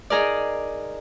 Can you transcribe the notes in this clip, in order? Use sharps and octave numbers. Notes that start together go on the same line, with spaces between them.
D#4 G#4 A#4 D5